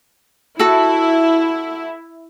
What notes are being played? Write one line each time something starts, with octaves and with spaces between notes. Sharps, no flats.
E4 F#4 A4